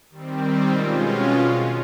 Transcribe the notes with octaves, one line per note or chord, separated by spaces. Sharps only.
D#3 G3 C4
B2 G#3 C#4 F4